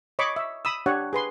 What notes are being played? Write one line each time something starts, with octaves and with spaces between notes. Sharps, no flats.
C#5 D#5 B5 C#6 D6
E5
B5 D#6 E6
D4 G4 C#5 F#5
G#4 B4 C6